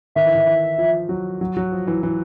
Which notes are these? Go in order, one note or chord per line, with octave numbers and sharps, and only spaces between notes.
D#3 E5
E3
D#3
E3
F3
F#3
F#3
F#3
F3
E3
E3